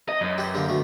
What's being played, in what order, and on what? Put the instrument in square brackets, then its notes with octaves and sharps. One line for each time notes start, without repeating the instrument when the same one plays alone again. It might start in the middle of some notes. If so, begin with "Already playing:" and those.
[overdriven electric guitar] D#5
F#2
[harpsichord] G4 B4
D3 G3 A#3
B2 D3 A3